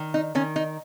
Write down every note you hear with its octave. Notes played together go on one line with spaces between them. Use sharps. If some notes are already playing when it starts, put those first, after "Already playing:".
Already playing: D#3
D#4
D#3 C#4
D#4